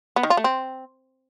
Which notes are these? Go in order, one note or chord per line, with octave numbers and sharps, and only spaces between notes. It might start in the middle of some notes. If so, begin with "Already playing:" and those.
B3
D#3
F4
A3
C4